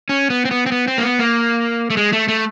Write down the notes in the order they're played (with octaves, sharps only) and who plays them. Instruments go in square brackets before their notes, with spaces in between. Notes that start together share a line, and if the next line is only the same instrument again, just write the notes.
[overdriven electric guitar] C#4
B3
C4
B3
C4
B3
C4
A#3
B3
A#3
A3
G#3
A3
A3